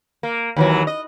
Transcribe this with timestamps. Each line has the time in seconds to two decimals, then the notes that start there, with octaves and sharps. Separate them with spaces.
0.23 A#3
0.57 D#2 E3 F#3
0.87 D#5